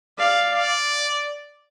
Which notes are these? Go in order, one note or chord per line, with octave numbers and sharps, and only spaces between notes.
D5 F5
D5